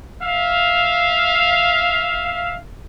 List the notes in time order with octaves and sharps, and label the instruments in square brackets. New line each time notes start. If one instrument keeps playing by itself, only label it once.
[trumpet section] E5 F5